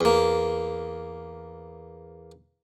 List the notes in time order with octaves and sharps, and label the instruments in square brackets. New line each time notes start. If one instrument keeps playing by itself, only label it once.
[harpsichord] E2 A#3